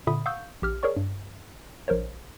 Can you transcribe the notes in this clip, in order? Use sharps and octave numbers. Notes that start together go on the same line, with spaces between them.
A#2 D3 E5 B5 D#6
F5 F#5 C#6 D#6 E6 G6
A#1 G4 F6
G#4 A#4 C#5 D5 C#6
G2
A#1 A#4 C5 C#5